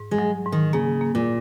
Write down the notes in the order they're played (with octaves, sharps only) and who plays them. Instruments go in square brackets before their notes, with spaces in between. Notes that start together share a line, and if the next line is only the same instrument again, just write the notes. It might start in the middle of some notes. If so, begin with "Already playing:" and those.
Already playing: [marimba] G#2
[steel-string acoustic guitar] G#3
[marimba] F#3
G#2
[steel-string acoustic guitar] D#3
[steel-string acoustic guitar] C#3 [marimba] A#3
[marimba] A#3
[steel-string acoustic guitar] A#2